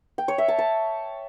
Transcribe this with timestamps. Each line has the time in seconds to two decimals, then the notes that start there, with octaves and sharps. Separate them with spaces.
0.18 G5
0.28 C#5
0.38 E5
0.48 A5
0.59 A5